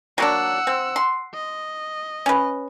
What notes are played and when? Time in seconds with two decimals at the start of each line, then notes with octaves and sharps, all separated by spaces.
0.18 F#3 A#3 D4 F#5 E6
0.67 C4
0.96 C6
1.34 D#5
2.26 C#4 B4